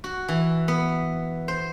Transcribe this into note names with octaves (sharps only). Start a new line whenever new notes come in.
F#4
E3
B3
C5